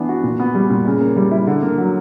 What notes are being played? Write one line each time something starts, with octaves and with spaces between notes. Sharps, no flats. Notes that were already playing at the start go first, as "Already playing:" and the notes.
Already playing: E3 B3 D4
F#4
A#2
B3
G3
A#2
C#3
A#3
G3
E4
D3
A#3
F#3